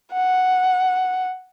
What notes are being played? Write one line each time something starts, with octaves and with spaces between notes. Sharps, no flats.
F#5